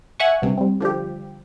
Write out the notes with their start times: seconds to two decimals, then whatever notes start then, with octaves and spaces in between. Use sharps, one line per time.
0.20 E5 F#5 G#5 C#6
0.42 C#2 G2 C3
0.57 G3 C4
0.80 D3 F3 G3 G4